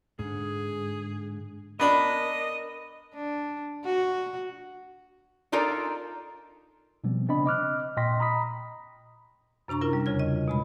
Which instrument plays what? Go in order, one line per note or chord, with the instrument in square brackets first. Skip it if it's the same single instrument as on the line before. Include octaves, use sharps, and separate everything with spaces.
[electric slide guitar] G#2 D3 [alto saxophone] G#4
[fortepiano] B3 D4 B5 [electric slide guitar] A#4 [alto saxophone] D#5
[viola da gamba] D4
F#4
[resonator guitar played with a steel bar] D4 D#4 F4 A4 A#4 D5
[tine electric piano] B2 F3 G3 B3 C4
C#3 C4 D4 D#5 B5
D#5 D6 F6 F#6
A#2 D#5 G5 C6 A#6 B6
A#5 B5 D#6 B6
[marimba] F#2 C3 D4 A#5 C#6
C#4 E4 F4 A#4
G3
E2 C#3 F4 G#6
D#5
B2 G#3 B5